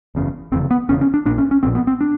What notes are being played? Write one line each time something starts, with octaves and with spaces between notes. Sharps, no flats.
F#1 E2 C#3
F1 E2 C#3 C4
B3
F1 E2 C#3 C#4
C#4
D4
A#1 A#2 D4
C#4
C#4
A#1 A#2 C4
B3
C4
D4